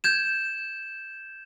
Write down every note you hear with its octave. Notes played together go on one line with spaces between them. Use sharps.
G6 G#6 E7